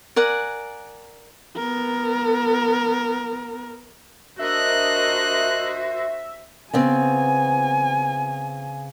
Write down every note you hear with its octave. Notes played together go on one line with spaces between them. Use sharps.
A#4 D5 F#5 G#5
B3 A#4
D4 F#4 A#4 C5 D#5 E5 F#6
C#3 B3 C4 G#5